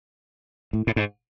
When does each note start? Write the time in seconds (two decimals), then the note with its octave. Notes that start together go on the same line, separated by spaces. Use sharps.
0.73 A2
0.87 A2
0.96 G#2